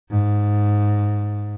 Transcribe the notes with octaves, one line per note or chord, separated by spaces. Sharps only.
G#2